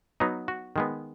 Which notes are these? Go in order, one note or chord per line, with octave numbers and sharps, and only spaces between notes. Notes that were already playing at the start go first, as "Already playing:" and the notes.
F#3 B3 D#4
F#4
D#3 G#3 B3